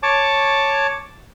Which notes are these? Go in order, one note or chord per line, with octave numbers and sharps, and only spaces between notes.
C#5 A5 D6